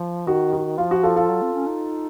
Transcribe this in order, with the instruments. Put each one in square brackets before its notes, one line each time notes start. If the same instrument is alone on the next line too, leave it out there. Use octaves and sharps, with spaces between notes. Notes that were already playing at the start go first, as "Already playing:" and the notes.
Already playing: [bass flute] F3
[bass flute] D#3 [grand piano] F#4
[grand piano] F#4
[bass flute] F3 [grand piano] F4
[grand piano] F#4
F4 A4
F4 A4
[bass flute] F#3
C4
C#4
D#4